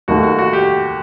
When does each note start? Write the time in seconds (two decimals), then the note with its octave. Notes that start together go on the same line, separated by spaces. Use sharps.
0.08 D#2 D#3 A3 F#4
0.23 F#4
0.39 F#4
0.53 G4